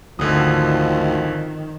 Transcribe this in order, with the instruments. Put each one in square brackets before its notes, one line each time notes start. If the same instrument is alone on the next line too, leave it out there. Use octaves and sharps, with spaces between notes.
[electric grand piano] G#1 D3 D#6 [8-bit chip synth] D2 [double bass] D#3 [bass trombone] F3